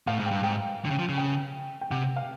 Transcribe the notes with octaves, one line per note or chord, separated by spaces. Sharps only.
A2 F5
G#2
G2 G5
G#2 G5
D3
C#3
F3
C#3
G5
G5
C3 F#5
F5